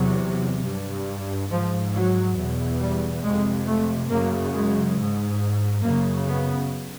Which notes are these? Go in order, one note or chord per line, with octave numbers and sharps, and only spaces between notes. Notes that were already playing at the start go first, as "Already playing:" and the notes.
Already playing: E2 C3 F#3
G2
G#2 F3
F#3
E2 B2
G3
F2 C3 G#3
A3
F#2 C#3 A#3
G#3
G#2
F#2 C#3 A#3
B3